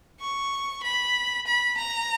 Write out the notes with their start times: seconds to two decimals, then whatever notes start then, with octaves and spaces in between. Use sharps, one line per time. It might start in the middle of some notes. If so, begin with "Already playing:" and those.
0.21 C#6
0.83 B5
1.46 B5
1.77 A#5